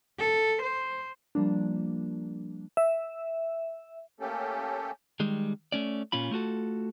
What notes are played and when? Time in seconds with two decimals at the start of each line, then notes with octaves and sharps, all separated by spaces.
0.19 A4
0.62 C5
1.35 F3 G3 A#3 D4
2.77 E5
4.20 A3 A#3 C#4 G4 A4
5.20 D#3 G3 G#3
5.72 A3 C#4 D5
6.12 A#2 C#4 F4 B5
6.31 A3 F4 F#4 A4